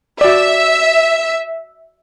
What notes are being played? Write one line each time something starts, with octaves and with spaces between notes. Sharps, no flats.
F#4 D5 E5